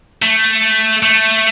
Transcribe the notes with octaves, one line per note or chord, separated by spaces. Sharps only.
A3
A3